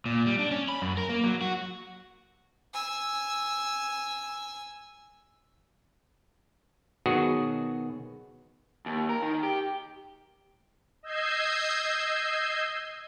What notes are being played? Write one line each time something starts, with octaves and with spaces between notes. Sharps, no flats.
A#2
G3
D4
C#4
B5
F#2
A#4
A#3
F#3
F#4
G#5 E6
B2 D#3 F#3 F#4 G#4
D#2
A#4
D#3
G4
D#5 E6 G6 G#6 C7